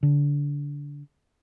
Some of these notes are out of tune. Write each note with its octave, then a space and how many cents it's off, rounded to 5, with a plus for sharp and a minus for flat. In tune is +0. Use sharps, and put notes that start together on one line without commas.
D3 -25